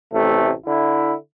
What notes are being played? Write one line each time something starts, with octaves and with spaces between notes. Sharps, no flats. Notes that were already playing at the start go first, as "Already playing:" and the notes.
A1 C3 A3
D3 E4